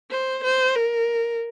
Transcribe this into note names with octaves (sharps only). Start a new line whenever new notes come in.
C5
C5
A#4